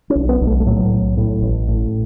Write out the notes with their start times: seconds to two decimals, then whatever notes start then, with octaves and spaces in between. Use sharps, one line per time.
0.10 C#4
0.15 B1
0.29 B3
0.41 B1
0.47 A3
0.60 A3
0.66 A2 F#3
0.92 B1
1.17 A2
1.42 A1
1.68 A2